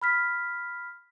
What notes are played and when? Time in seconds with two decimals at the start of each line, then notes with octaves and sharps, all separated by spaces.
0.02 B5 F6 B6